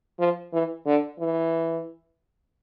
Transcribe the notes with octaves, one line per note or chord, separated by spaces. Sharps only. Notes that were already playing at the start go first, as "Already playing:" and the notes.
F3
E3
D3
E3